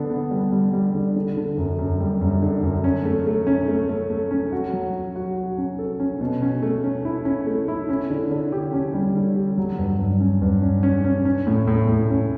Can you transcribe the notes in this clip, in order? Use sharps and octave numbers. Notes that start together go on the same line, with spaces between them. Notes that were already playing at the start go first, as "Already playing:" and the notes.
Already playing: D3 B3
B3
G3
G3
G3
D3
D3
D3
F#2
F#2
G3
F#2
D3
F#2
C#4
A3
A3
C#4
A3
A3
A3
C#4
F#4
F#3
F#4
F#4
F#4
C#4
A4
C#4
B2
C#4
A3
C#4
E4
C#4
A3
E4
C#4
D3
D3
G4
C#4
G3
D3
G4
F#3
G2
G2
C#4
G2
C#4
C#4
C#4
C#4
A2
A2
A2
C#4